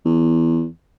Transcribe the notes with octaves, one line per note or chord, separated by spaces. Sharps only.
E2